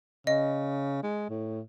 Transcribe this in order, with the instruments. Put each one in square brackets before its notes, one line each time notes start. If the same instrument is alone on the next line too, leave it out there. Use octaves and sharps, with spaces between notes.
[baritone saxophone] C#3 [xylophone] D#5
[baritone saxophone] G#3
A2